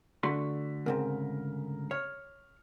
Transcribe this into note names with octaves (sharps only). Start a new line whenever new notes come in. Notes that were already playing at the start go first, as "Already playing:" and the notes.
D3 A3 F#4 C6 B6
D2 G#2 C#3 C4 A#4
C#5 F6